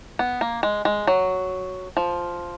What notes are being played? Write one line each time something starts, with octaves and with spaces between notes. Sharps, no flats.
B3
A#3
G#3
G#3
F#3
F3